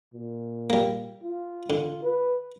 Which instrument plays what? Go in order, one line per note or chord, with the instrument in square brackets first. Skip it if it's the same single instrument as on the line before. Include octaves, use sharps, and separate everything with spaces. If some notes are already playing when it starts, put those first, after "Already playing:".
[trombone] A#2
[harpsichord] G3 A#3
[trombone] F4
[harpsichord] D3
[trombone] B4